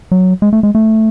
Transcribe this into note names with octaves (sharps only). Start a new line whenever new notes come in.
F#3
G#3
A3
G#3
A3